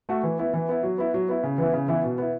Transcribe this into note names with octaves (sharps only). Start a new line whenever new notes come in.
A3 F#4
E3
B3 E4
E3
B3 E4
F#3
B3 E4
F#3
B3 E4
C#3
E3 B3 E4
C#3
E3 B3 E4
B2
B3 E4